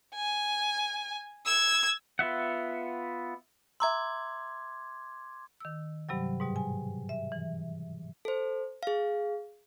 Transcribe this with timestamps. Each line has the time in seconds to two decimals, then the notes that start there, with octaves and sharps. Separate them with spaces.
0.15 G#5
1.46 E6 G#6
2.19 B3 F4 E5 F#5
3.80 E5 A#5 C6 D6 E6 G#6
5.60 D#3 E6
6.09 G2 C3 F#3 G3
6.40 G#2 B2 G3
6.56 G#5
7.09 E5
7.32 E3
8.25 A4 C5
8.83 G#4 F5